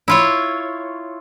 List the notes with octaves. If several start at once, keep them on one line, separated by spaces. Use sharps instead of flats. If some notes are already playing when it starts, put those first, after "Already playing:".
E4 F4 C#5